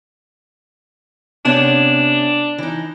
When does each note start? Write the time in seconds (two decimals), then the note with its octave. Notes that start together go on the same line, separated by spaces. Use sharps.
1.45 C3 B3 C#4 D4
2.58 E3 D#4